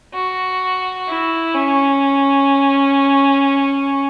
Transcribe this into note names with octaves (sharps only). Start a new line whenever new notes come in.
F#4
E4
C#4